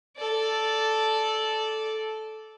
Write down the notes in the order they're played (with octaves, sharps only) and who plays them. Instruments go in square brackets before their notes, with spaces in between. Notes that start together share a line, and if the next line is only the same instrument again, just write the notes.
[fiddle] A4 D5